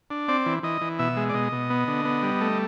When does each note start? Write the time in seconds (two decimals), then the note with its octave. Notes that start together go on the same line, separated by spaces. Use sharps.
0.10 D4
0.28 C4 D5
0.46 E3
0.63 E3 D#5
0.82 E3
0.99 B2 E5
1.17 G#3
1.29 D5
1.34 B2 D#5
1.52 B2
1.70 B3
1.88 D3
2.05 B3
2.23 G3
2.41 A3